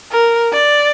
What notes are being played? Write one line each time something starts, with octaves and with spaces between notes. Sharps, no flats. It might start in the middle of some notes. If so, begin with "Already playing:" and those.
A#4
D5